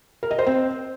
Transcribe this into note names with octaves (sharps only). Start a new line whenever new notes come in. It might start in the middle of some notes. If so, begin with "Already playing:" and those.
A#4
D#5
C5
C4